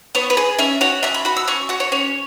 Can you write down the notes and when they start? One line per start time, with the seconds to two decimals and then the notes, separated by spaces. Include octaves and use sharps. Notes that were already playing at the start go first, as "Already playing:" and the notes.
0.15 B3 C#5
0.30 B4
0.37 G#4
0.59 C#4 E5
0.81 F#4 C#5
1.03 C#4 E5
1.14 B5
1.25 F#4 B5
1.37 E6
1.48 C#4 C#6
1.69 F#4 F#5
1.80 C#5
1.92 C#4 C#5